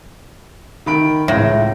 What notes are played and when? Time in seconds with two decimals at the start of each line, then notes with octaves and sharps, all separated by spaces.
0.86 D#3 B5 D7
1.28 C#2 A2 A#6